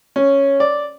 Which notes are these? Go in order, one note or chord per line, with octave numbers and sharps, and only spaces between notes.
C#4
D5